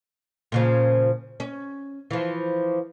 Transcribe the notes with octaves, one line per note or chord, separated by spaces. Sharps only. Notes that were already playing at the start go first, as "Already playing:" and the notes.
A#2 C#3 F3
C#4
E3 F3